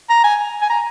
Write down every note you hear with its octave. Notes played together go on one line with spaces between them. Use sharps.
A#5
G#5
G#5
A#5